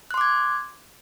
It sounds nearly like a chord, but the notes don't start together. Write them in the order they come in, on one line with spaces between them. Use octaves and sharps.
F#6 C6 D6 G#6